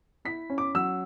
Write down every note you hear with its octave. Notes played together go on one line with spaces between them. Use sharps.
E4 B6
C#4
D6
F#3 E6